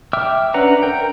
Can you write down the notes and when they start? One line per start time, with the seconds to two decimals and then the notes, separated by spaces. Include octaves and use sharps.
0.13 E5 G5 D6 E6 F6
0.54 C#4 D4 B4 F#5 A#5
0.83 A#4 G5